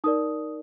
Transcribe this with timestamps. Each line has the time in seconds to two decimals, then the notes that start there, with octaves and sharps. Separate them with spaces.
0.04 D#4 A#4 D5 D#6